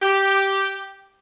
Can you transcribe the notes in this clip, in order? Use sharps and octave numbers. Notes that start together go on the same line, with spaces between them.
G4